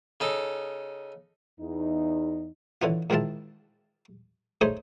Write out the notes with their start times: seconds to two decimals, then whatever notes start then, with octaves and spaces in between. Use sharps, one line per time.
0.20 C#3 D#4 A4
1.60 E2 D#4
2.82 D3 E3 C#4 F4
3.10 G#2 D#3 G#3 E4 F4 A5
4.61 A3 D#4 G#4 C5 C#5